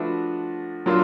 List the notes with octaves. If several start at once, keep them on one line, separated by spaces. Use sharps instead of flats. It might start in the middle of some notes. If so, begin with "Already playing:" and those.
Already playing: F3 A3 D4 F#4 B4
F#3 A#3 D4 F4